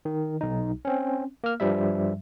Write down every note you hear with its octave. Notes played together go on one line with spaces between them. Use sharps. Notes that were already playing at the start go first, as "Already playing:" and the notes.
D#3
B1 D#4
C4 C#4
A#3 F6
G2 F3 G3 E5